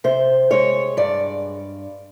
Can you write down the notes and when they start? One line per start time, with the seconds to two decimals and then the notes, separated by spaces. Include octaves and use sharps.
0.04 C3 C5
0.51 G#3 C#5
0.97 G2 D5